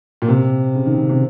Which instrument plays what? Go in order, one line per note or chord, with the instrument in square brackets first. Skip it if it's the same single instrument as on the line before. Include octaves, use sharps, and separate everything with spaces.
[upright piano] A#2
C3
C#3
D#3
C#3
C3